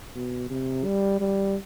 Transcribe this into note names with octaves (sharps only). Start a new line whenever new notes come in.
B2
C3
G3
G3